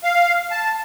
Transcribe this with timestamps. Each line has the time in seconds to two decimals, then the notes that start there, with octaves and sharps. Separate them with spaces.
0.04 F5
0.51 A5